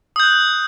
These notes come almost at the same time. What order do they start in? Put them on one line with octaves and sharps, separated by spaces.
D#6 G6 F#6